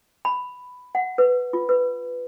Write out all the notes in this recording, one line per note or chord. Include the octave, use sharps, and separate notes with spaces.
B5
F#5
B4
F4
B4